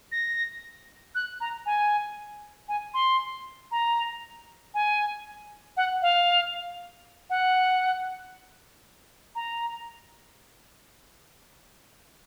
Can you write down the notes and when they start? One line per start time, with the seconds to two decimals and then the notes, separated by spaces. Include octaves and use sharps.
0.12 A#6
1.15 F#6
1.40 A#5
1.66 G#5
2.68 G#5
2.94 C6
3.71 A#5
4.74 G#5
5.77 F#5
6.02 F5
7.30 F#5
9.35 A#5